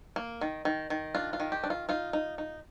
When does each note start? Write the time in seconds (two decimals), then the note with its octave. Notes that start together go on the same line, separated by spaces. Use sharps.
0.16 A#3
0.41 D#3
0.65 D#3
0.90 D#3
1.15 D4 F4
1.33 F4
1.40 D#3
1.52 G4
1.64 D4
1.70 F4
1.89 D#4 F4
2.13 D#4
2.38 D#4